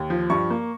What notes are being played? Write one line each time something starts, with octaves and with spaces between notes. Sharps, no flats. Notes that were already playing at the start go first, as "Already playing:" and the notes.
Already playing: D#2
F3
G2 C#6
A#3